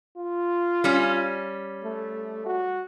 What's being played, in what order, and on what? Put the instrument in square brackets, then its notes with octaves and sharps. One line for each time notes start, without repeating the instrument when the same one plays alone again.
[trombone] F4
[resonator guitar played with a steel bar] G3 C#4
[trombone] A3
F#4